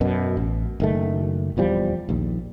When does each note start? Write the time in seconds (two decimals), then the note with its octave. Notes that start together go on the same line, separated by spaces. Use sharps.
0.01 F#2 B2
0.37 A1
0.80 F#1 D#3 A3
1.57 D#1 E2 F3 G3
2.09 A#1 D#2